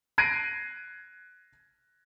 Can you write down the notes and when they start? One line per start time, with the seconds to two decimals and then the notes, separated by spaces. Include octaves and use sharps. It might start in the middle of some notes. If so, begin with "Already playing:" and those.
0.18 F#6 G#6 A#6 C7 D7 D#7